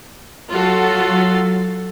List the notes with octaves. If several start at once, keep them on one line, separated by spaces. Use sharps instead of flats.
F#3 F4 F#4 A4